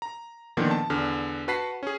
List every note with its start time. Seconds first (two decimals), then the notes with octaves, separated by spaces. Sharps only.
0.02 A#5
0.57 A#2 D3 D#3 F3 B3
0.71 A5
0.90 E2 D3 F6
1.48 F#4 B4 F#5 A5 B6 C7
1.83 C#4 G#4